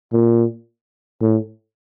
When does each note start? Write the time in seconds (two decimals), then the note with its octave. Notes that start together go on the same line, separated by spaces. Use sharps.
0.12 A#2
1.21 A2